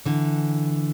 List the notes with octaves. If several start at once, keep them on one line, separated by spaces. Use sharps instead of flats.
D3 E3